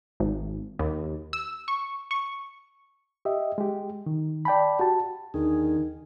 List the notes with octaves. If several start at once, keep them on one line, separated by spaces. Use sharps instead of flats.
G#1
D#2
E6
C#6
C#6
G4 D#5 E5
G#3 G4
D#3
D5 G5 A5 B5
F#4 G4 A5
D#2 D3 D#3 G#4